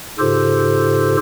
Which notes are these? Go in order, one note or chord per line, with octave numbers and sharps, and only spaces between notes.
G#2 C#3 F4 G4 A4 C5